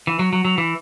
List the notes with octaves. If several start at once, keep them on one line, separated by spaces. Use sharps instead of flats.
E3
F#3
F#3
F#3
E3